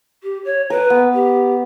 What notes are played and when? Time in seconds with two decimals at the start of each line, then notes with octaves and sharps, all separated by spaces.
0.23 G4
0.45 C#5
0.70 A#4 B4
0.90 B3
1.14 G4